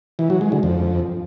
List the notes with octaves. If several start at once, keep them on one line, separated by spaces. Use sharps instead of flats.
E3
F#3
G#3
D3
F2